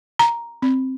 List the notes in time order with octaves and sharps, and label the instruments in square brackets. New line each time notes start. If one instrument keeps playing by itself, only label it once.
[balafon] A#5
C4